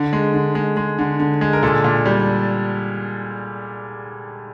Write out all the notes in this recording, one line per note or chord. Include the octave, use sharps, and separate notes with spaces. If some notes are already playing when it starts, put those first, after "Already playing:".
Already playing: D3
G#3
D3
G#3
G#3
D3
D3
G#3
A#4
A#2 A4
A#2
G3